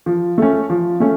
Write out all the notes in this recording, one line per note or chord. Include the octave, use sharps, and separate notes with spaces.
F3
A3 C#4
F3
A3 C#4